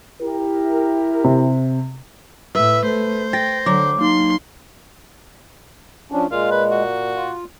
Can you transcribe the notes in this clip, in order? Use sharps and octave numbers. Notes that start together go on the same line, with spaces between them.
E4 G4 A#4
C3
A2 B4 E5
A3 C5
G5 A6 A#6
D3 F#3 D6
A#3 D#4 C6
F3 C#4 D4
A#2 G#3 F4
B4
F#4
F4